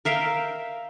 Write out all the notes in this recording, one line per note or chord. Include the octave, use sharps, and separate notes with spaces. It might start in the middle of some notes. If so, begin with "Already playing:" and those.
A#4 E5 F5 G5